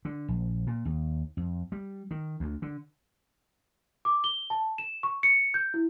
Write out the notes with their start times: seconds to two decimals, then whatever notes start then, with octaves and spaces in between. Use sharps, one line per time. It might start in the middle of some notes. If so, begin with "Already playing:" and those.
0.05 D3
0.28 A#1
0.67 A#2
0.85 D#2
1.37 F2
1.72 G3
2.11 D#3
2.40 D2
2.62 D3
4.05 D6
4.24 G7
4.50 A5
4.78 E7
5.03 C#6
5.23 C#7
5.54 G6
5.74 E4